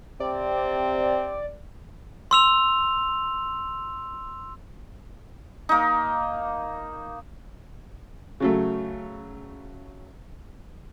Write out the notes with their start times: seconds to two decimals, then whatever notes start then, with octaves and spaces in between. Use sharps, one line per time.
0.20 C3 C4 D5
2.31 C6 E6 F7
5.69 A#3 D#4
8.40 C#3 F#3 A3